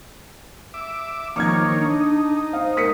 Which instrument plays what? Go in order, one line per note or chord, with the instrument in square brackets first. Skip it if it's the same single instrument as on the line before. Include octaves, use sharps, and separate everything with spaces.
[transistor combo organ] E5 D6
[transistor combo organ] D#3 A#3 C#5 [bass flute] F3 [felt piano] D6 F6 G#6
[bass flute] D4
[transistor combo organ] D#4
[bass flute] C5 [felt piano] F5
[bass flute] A#4 [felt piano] D#6 B6 C#7